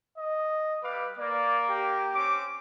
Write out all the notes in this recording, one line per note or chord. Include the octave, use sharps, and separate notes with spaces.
D#5
G3 B4 F5 D6
A#3 D5
G4
C4 C#4 D6